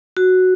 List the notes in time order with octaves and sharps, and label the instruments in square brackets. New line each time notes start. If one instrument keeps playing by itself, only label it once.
[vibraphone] F#4